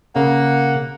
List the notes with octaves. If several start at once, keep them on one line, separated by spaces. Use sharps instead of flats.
C#3 A#3 F#5